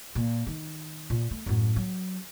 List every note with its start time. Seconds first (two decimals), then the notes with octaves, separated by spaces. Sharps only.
0.15 A#2
0.47 D#3
1.10 A#2
1.31 A3
1.46 F#2 A2
1.76 F#3